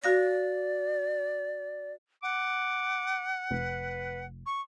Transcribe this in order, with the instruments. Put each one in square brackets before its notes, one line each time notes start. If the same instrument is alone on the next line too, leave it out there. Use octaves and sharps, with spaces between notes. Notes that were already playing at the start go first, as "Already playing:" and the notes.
[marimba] F#4 F5 A#6 [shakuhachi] D5
[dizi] F#5 [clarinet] D6
[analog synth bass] F1 [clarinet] B4
[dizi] C#6